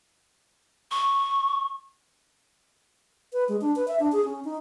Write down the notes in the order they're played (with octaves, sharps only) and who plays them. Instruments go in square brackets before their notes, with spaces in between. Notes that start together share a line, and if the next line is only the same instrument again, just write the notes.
[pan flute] C#6
[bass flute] B4
G#3
D4
B4
E5
D4
G#4
C#4
D#4